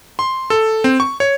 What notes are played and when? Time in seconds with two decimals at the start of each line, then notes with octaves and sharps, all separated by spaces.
0.19 C6
0.50 A4
0.84 C4
1.00 C#6
1.20 C#5